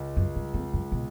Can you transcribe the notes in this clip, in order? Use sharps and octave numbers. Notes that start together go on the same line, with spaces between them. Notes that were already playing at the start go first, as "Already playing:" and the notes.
Already playing: C#2
F#2
G2
F2
F#2
B2